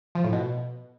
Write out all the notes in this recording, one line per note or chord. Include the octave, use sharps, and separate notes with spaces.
F3
A2
B2